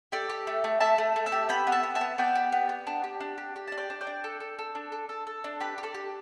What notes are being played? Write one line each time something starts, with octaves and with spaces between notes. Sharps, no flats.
G4 A4 D5
G4
A3
A3
A3 E5 A5
A3
A3
E5 A5
G4
B3 G5 B5
B3
E5 A5
B3
E5 A5
B3
B3 D5 G5
G4
B3
B3
D4
G4
D4
G4
G4
D4 A5
D5 G5
D4
D5 G5
D4
A4
A4
A4
D4
A4
A4
A4
D4
G4 B4
G4
A4 D5
G4